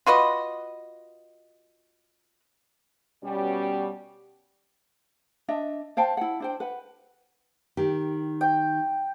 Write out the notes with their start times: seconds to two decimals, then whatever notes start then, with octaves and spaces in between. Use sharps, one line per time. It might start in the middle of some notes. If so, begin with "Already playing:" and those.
0.06 F4 F#4 B4 D#5
3.24 B2 G3 C#4
5.48 D4 D#5 E5
5.97 C5 F5 G5 A5
6.17 E4 F#5
6.40 D4 C5 G5
6.60 B4 F#5
7.77 D#3 G4
8.41 G5